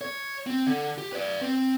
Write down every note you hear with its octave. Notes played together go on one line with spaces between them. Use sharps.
C#5
C4
D3
G4
B4 D5
C4